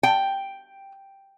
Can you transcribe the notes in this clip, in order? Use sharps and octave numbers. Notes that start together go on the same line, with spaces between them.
G5